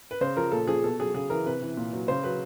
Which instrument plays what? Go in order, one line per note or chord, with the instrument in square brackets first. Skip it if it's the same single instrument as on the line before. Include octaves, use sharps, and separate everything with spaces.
[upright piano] B4
C#3 C5
F3 A#4
A#2 A4
F3 G#4
B2 A4
F#3 G#4
C#3 G#4
E3 A#4
C3 B4
E3
A#2
F#3
C#3 C5
F#3 B4